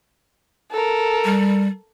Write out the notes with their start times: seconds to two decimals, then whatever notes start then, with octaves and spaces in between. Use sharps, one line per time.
0.72 A4 A#4
1.25 G3